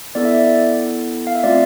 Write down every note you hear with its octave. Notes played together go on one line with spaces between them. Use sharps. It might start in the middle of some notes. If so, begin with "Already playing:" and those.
B3 E4 A4 D5
E5
D5
F5
E5
A3 C4 F4 D5